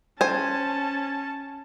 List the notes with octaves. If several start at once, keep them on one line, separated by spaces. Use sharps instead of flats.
C#4 C5 G#5 A5